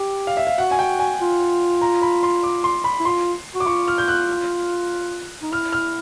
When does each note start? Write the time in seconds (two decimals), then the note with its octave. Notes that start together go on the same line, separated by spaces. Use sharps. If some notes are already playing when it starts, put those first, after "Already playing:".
Already playing: G4
0.27 F5
0.37 E5
0.47 F5
0.58 F#4 F#5
0.71 G#5
0.79 G5
0.99 G#5
1.20 F4
1.82 A#5
2.02 B5
2.23 C6
2.43 D6
2.64 C6
2.84 B5
3.00 E4
3.05 F4 C6
3.55 F#4
3.60 D6
3.67 F4 C#6
3.88 F6
3.98 G6
4.08 F#6
5.42 D#4
5.52 E4 F6
5.73 F6